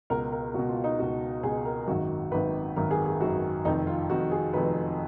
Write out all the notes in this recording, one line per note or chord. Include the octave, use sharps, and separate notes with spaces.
C#2 B2 A#4
A#4
C#2 B2 F#4
F4
D#4
C#2 B2 F#4
C#2 B2 G#4
A#4
G#1 F#2 D#3 F#4
G#1 F#2 D#3 B4
G#1 F#2 D#3 A#4
G#4
G#4
G#1 F#2 D#3 F#4
F1 F2 D#3 D#4
F4
F1 F2 D#3 F#4
G#4
F1 F2 D#3 B4